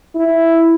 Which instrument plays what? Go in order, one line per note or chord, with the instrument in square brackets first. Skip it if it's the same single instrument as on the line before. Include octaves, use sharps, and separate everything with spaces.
[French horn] E4